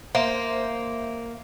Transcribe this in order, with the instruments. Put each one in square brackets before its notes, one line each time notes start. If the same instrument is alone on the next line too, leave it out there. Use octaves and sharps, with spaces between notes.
[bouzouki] A#3 [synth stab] C5 [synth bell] E5